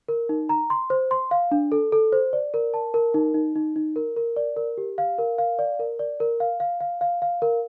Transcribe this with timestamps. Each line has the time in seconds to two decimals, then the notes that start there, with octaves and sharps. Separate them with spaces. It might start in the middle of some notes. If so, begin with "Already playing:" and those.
0.08 A#4
0.29 D#4
0.49 A#5
0.70 C6
0.90 C5
1.11 C6
1.31 F5
1.51 D4
1.72 A4
1.92 A4
2.12 C5
2.33 D5
2.54 A#4
2.74 A5
2.94 A#4
3.14 D#4
3.34 D#4
3.55 D#4
3.76 D#4
3.96 A#4
4.16 A#4
4.36 D5
4.57 A#4
4.78 G4
4.98 F5
5.18 A#4
5.38 F5
5.59 D5
5.79 A#4
5.99 D5
6.20 A#4
6.40 F5
6.60 F5
6.81 F5
7.01 F5
7.22 F5
7.42 A#4